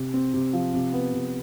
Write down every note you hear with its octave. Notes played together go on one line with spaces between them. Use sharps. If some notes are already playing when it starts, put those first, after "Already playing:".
Already playing: C3
C4
C3
F3
C3
B3
C3